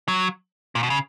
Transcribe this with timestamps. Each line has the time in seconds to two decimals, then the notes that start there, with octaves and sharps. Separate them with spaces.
0.08 F#3
0.75 A#2
0.83 B2
0.90 C#3